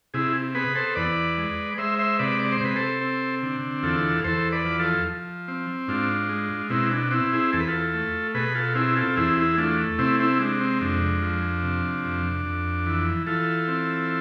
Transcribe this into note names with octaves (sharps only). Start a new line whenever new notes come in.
C3 E4 G#4
B3 G#4 B4
A4 C5
E2 B4 D5
G#3
G#3 C5 E5
C5 E5
C3 B4 D5
D5
C5
C3 B4
A4 C5
C4
D3
E2 F4 A4
E2 A4 C5
B4 D5
F3
F4 A4
F3
C4
G#2 D4 F4
G#3
B2 C4 E4
D4
C4 E4
E4 G#4
E2 A4
B4
F4 A4
A3
B2 G#4 B4
F4 A4
C4 E4 G#4
F4 A4
E2 E4 G#4
E4 G#4
A3 D4 F4
C3 C4 E4
C4 E4
G#3 D4
C4
F2 D4
F3
C3
F2
F2
E3
E3 F4 A4
C4